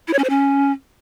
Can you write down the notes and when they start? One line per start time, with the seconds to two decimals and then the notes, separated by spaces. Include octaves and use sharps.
0.08 E4
0.13 C#5
0.19 C#4
0.24 C5
0.30 C#4